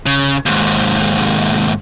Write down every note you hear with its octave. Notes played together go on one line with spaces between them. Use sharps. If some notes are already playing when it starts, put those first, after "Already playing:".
C#3
D#2 G#2